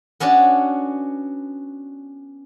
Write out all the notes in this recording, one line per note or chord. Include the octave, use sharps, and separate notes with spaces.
B3 C#4 D4 F#4 A5